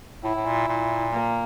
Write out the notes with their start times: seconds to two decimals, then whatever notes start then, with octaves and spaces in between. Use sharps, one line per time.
0.24 A2 E4
0.35 A2
0.46 A#2
0.68 A#2
1.12 A#3